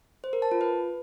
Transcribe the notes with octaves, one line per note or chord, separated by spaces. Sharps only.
C5
A#4
A5
F4
B4